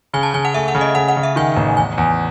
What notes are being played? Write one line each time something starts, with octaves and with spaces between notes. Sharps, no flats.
C#3 G#5
A5
C#3 G#5
F#5
A3 E5
F#5
C#3
D#5
C#3 F#5
F#5
C#3
E5
D#3 G#5
A1
E2 G#5
E2